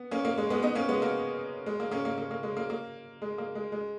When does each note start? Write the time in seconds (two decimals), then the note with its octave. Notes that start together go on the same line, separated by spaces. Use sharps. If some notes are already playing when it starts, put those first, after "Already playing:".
Already playing: B3
0.11 A#3 C#4
0.25 A#3
0.37 G#3
0.50 G#3 B3
0.63 B3 D#4
0.75 A#3 C#4
0.89 G#3 B3
1.02 A#3
1.66 G#3
1.80 A#3
1.91 A#3 C#4
2.05 A#3
2.18 A#3
2.31 A#3
2.43 G#3
2.57 A#3
2.70 A#3
3.22 G#3
3.38 A#3
3.55 G#3
3.72 G#3